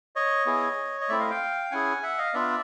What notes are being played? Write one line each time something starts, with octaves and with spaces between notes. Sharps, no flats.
C#5 D#5
B3 E4 G#4
D#5
A3 C4 E4 D5 E5
D#5 F5
F5 G5
C#4 E4 G#4 F#5 G#5
E5 F#5
D#5 F5
B3 D4 F4 D5 E5